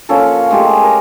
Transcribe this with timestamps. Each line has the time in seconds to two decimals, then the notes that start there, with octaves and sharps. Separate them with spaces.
0.09 F3 A#3 C#4 A4
0.51 G#3 A3 G4 A4
0.83 A#4